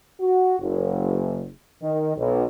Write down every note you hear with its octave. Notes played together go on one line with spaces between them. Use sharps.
F#4
F#1
D#3
B1